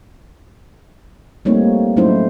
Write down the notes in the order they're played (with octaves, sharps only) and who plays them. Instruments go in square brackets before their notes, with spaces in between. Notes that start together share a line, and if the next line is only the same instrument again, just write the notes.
[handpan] G3 A3 A#3 C4 D#4 C#5
F#3 A3 C#4 D#4 E4 C5